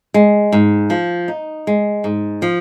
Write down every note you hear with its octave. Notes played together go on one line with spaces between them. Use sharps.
G#3
G#2
F3
D#4
G#3
G#2
F3